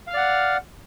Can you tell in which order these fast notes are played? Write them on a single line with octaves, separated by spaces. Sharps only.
F5 F6 D5 F#5